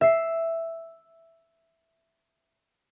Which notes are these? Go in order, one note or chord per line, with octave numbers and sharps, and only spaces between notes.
E5 C7